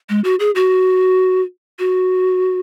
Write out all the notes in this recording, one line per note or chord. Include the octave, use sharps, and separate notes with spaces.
G#3
F#4
G#4
F#4
F#4